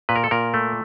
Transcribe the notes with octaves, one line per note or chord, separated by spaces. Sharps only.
A#2 B4
A#4
A4
A#2 A#4
A3